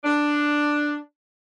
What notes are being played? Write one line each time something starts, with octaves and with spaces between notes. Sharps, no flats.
D4